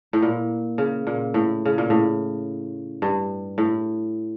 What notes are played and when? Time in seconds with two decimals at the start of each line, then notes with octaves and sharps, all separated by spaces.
0.13 A2
0.22 A#2
0.78 C#3
1.07 A#2
1.34 A2
1.65 C#3
1.78 A#2
1.90 A2
3.02 G2
3.58 A2